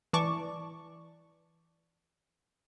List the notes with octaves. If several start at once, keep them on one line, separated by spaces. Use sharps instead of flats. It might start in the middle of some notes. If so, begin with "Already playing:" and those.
E3 D5 A5 C#6 D6